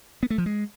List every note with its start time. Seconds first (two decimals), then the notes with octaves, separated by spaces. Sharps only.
0.23 B3
0.30 A3
0.38 F3
0.46 G#3